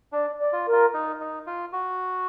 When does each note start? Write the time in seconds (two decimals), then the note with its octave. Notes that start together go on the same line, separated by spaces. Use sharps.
0.12 D4 D5
0.39 D5
0.52 F4
0.66 A#4
0.72 F4
0.94 D#4
1.20 D#4
1.47 F4
1.73 F#4